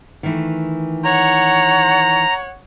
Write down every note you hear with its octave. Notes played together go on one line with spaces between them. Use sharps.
D#3 E3 A3
C#5 F#5 A#5